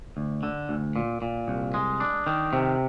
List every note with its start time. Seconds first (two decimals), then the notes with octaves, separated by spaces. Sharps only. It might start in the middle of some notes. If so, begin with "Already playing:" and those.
0.17 D2
0.43 D3
0.69 D2
0.96 A#2
1.22 A#2
1.48 C2
1.74 G#3
2.00 D4
2.27 D#3
2.53 C3